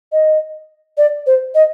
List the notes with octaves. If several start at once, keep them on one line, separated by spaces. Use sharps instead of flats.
D#5
D5
C5
D#5